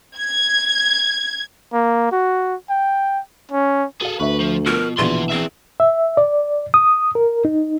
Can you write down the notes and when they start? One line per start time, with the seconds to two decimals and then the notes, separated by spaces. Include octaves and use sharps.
0.17 G#6
1.73 A#3
2.12 F#4
2.70 G5
3.51 C#4
4.01 F#4 G#4 A4 F5
4.20 D2 B4 E5 C#6
4.40 F3
4.67 B2 F3 A#4
4.98 A#1 B2 D3 E3 F4 C6
5.30 C4 G#4 E5
5.80 E5
6.17 D5
6.74 D#6
7.15 A#4
7.45 D#4